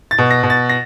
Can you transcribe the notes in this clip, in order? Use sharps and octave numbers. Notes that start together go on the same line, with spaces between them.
A6
B2
A#6
B2
A6
A#6